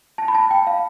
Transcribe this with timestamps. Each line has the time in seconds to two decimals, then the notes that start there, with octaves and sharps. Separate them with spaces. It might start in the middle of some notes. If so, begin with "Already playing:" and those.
0.18 A5
0.28 B5
0.35 A5
0.51 G5
0.67 F5